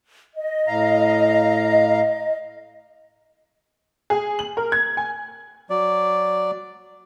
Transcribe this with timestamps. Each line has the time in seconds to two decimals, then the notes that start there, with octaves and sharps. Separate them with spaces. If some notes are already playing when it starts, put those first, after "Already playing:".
0.34 D#5
0.68 A2 F5 A#5
4.10 G#4
4.39 F#7
4.57 A#4
4.72 G#6
4.97 G#5
5.70 F#3 D5